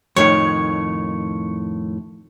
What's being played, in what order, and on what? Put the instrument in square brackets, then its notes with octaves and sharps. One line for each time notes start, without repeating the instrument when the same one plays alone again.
[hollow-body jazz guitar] F2 A2 D#3 [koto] C#5 [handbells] C#6 C#7